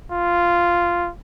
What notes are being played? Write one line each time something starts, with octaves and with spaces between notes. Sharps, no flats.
F4